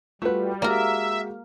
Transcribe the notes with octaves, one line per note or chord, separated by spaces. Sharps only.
G3 A3 F4 F#4 B4
G#3 A#3 F#4 G4 A#4 D5 E5 A#5